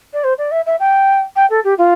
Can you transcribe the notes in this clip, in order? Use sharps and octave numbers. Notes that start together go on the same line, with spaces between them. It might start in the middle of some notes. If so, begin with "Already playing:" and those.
D5
C5
D5
E5
E5
G5
G5
A4
G4
F4